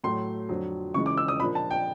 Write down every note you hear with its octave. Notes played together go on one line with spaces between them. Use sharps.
A2 F#3 A3 C6
F2 D3 F#3
C#3 E3 G#3 C#6
D6
E6
D#6
A#2 F3 A#3 D4 B5
A5
G5